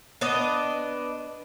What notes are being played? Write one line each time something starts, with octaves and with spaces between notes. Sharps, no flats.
B3 D4 D#5